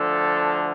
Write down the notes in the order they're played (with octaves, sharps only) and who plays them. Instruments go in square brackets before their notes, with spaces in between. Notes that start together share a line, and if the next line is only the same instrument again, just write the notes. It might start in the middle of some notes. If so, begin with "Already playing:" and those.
Already playing: [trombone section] D2 D3 F3 A4